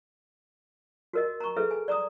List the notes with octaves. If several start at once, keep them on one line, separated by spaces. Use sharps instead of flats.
F#4 A#4 D#5
A#5 C#6
G#4 A4 B4 E5
G#5
D5 A#5 D6 D#6